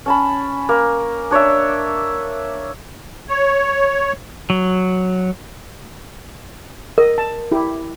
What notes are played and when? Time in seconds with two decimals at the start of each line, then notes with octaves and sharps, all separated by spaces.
0.06 C#4 A5 B5
0.69 A#3
1.31 D4 C#5 D5 E5
3.29 C#5
4.50 F#3
6.98 A#4 D#5
7.18 A5
7.52 E4 G4